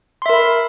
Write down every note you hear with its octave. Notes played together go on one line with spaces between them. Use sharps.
A#4 E5 B5 C6